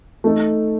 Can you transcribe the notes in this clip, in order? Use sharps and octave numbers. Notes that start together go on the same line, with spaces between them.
A3 D#4 A4